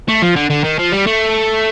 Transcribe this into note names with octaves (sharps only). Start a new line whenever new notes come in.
A3
F3
D3
D3
D#3
F3
G3
A3